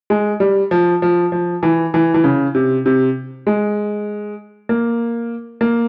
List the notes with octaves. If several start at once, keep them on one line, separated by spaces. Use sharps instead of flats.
G#3
G3
F3
F3
F3
E3
E3
E3
C#3
C3
C3
G#3
A#3
A#3